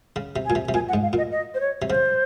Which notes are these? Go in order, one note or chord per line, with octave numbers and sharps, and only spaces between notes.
C#3
C3
G#5
A#2
C3
C3
A#2 G#5
F#5
G#2
F5
A#2 D#5
D#5
C5
C#5
C3
C#3 C5